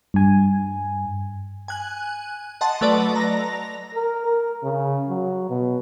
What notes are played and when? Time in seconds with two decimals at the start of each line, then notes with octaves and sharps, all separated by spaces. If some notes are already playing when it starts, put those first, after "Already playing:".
0.14 G2 G#5
1.68 G#5 F#6
2.61 D#5 F#5 A5 C6
2.81 F#3 A3 B4 D5 D#5
3.16 A#5 A#6
3.95 A#4
4.26 A#4
4.64 C#3
5.09 F#3
5.50 B2